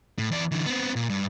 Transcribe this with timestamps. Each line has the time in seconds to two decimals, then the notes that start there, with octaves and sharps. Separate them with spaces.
0.18 A2
0.31 E3 D5
0.52 D3 E3
0.66 B3 C4
0.96 A#2
1.09 G2